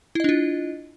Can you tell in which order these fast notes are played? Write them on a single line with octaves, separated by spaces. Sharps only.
E4 D#5 D4 F4